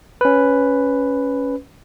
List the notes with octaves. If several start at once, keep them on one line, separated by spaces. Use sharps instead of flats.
C#4 B4